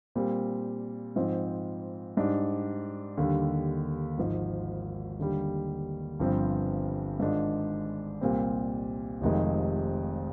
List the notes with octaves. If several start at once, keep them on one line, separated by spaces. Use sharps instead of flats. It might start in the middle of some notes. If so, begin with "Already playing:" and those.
A#2 G3 C4
G#2 F3 C4
G#2 G3 D4
D#2 D3 G3
G#1 G#2 F3
D#2 D3 G3
G1 G2 F3 C4
G#2 D#3 G#3 D4 F4
C2 A#2 G3 C4
F1 F2 C3 D#3 G#3